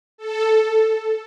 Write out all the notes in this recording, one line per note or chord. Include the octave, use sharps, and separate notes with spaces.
A4